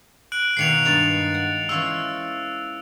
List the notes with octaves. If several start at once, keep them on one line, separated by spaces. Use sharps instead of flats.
F#6 D7 F#7
B2 D#3 A#3 C7 C#7 F7
G2 G#3 A#5 A6 F7
F#5
E3 C#4 F4 E6